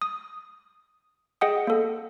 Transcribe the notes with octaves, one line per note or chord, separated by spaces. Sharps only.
D#6
G#4 D#5 F#5 G5 D#6
A#3 A4